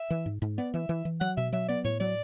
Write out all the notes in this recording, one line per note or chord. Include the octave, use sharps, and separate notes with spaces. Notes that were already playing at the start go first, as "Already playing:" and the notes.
Already playing: E5
E3
G#2
G#2
B3 D5
E3 E5
E3
E3
F#3 F#5
B2 E5
F#3 E5
B3 D5
A2 C#5
F#3 D5